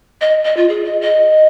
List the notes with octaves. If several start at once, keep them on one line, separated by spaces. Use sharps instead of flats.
D#5
D#5
F4
G#4
D#5
D#5